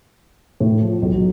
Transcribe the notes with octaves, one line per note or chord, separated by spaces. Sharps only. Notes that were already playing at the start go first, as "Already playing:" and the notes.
A2
F3
B1
F#3